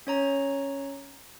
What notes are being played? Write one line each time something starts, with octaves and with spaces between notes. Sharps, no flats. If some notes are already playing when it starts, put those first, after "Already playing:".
C#4 C#5 A#5